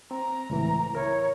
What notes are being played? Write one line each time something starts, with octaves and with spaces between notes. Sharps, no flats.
C4 A#5
C#2 A2 E3
E4 A#4 C#5